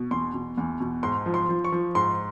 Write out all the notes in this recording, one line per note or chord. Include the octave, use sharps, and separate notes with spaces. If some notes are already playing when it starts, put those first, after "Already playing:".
Already playing: B2
E2 C6
B2
E2
B2
G#2 C6
F3
C6
F3
C#6
F3
G#2 C6